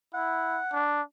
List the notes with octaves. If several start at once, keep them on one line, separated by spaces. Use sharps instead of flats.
E4 F#5
D4